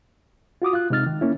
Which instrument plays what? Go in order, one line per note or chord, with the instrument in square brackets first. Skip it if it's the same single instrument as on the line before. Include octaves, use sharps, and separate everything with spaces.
[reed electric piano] F4 F#4 D6 D#6
F4 F#6
C3 G#3 D#4 F6 A6
D#3
A#3 C#4 E4